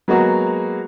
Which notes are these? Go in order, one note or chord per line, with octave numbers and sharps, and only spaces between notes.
F#3 G#3 A#3 B3 F#4 G#4